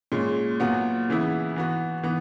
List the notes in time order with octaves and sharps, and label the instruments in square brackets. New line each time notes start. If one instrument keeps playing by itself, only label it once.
[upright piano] A#2 G#3 C#4
A#2 F#3 B3 F#4
C#3 E3 B3 E4
E3 B3 F#4
E3 B3